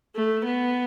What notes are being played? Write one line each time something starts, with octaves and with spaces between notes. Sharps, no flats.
A3
B3